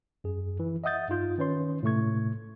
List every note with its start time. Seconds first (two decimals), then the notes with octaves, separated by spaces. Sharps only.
0.24 F#2 G#4
0.60 E3
0.84 D#5 E5 F#5 D#6 G6 A6
1.08 G2 D#4 F4 G6
1.38 D#3 C#4 B4 C#5 C6
1.83 A2 C3 A3 C#6 G#6